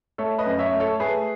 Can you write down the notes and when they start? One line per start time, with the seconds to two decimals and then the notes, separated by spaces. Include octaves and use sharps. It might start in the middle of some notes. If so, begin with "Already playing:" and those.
0.18 A3 A4 C#5
0.38 B4 D#5
0.46 F#2
0.59 C#5 E5
0.73 A3
0.80 A4 C#5
1.00 A3 G#4 B4